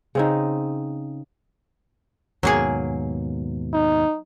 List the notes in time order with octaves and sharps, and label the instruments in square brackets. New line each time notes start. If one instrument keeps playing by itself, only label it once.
[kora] C#3 C4 D#4
[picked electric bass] D#2 G#2 B2 [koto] F#3 A#3 G#4
[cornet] D#4